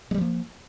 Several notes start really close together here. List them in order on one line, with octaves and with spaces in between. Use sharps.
G#3 G3 F3 A#3